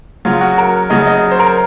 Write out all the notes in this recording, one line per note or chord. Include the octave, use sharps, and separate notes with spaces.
C#3 F#3 F4
F#4
A#4
C#3 F#3 D#5
D#5
C5
A#4